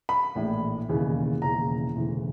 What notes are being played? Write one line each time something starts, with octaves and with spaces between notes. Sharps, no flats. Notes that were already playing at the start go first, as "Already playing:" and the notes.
B5
A#1 A2 E3
E1 D#2 C#3 E3
E1 D#2 C#3 E3 A#5
E1 D2 C#3 E3